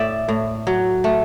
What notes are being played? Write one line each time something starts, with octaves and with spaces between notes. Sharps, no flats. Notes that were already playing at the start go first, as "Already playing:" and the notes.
Already playing: A2 D5 E5
A2
F#3
A3